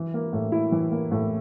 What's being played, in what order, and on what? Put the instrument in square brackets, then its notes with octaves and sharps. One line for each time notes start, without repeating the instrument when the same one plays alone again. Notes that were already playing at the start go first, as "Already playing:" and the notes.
Already playing: [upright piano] E3
A#3
A2
E4
E3
A#3
A2